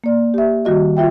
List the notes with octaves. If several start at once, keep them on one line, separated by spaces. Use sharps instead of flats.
A#3 D5
G4 E5
D#3 G3 F#4 D#5
F4 E5 G5